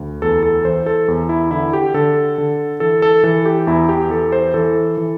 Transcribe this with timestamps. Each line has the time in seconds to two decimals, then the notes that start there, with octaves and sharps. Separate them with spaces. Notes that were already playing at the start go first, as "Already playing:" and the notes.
Already playing: D2
0.22 E2 A4
0.43 A4
0.65 E3 C5
0.86 A4
1.08 E2
1.29 E4
1.51 D3 E4
1.73 G4
1.94 D3 A4
2.38 D3
2.80 E3 A4
3.02 A4
3.24 E3 A4
3.45 G4
3.67 E2 E4
3.89 G4
4.10 E3 A4
4.32 C5
4.54 E3 A4
4.97 E3